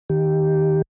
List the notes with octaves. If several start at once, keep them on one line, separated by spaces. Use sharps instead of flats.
D#3 G4